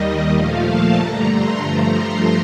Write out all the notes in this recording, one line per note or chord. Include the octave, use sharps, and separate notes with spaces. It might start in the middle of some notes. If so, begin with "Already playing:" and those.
Already playing: D#2 D#3 G3 D#5
A#2 F3 A3 F5
A5
G2 D3 A3 A#5
C6
G2 F3 A3 A#5
C6